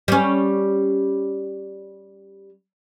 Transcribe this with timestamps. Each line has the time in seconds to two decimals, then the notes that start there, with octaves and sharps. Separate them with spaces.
0.08 G3 C#4